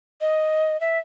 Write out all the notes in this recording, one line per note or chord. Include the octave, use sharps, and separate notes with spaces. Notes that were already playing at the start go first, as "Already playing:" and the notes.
D#5
E5